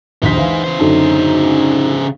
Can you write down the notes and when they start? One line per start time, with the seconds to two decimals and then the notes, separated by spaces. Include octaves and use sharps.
0.23 A#1 D#2 D#4 C5 B6
0.36 E3 E4 F5
0.64 C#3 C5
0.79 F#2 D3 D#4 A4